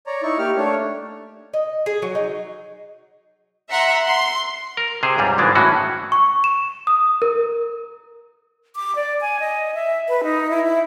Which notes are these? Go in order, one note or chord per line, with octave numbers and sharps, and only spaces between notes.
C#5 D5 A#5
D#4 E4 C#6
A#3 G4 F6
A3 D4 C#5
D#5
G#4
F#3
D#4
E5 F#5 A#5 C6
C6
A#4
C3 G#4 C5
C#2 G#2 G3
G#1 E3 G#3 D4
A2 E3 C#4 F#4
C#6
E7
D#6
A#4
D6
D5
G#5
D#5
E5
B4
D#4
E4
E4